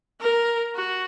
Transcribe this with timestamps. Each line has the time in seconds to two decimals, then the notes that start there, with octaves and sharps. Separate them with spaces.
0.21 A#4
0.75 F#4